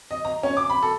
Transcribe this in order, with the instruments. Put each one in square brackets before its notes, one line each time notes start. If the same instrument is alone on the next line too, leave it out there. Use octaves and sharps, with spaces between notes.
[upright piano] D#5
A#5
C#4
D6
B5
A4